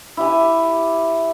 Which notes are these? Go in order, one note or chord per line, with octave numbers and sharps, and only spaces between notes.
E4 G4 G#5